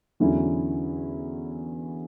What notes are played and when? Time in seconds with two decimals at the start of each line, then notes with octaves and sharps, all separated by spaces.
0.20 E2 D3 F#3 C#4 E4